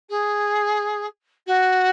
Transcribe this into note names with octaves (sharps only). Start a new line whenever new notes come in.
G#4
F#4